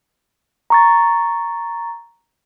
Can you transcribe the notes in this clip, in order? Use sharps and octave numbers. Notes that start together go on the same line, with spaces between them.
A#5 C#6 A6